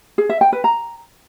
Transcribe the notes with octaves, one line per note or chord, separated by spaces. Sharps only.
G#4
E5
G5
B4
A#5